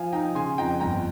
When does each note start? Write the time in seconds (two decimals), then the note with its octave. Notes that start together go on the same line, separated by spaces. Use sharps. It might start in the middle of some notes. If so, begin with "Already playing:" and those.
Already playing: F3 F5 G#5
0.13 D#4 G5 A#5
0.35 C#3 G#5 C6
0.58 F2 G5 A#5
0.80 G1 G5 A#5